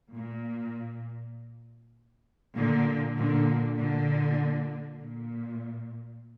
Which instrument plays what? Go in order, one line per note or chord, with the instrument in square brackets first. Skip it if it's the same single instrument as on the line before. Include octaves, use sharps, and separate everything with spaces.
[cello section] A#2
A#2 D3
A#2 D3
A#2 D3
A#2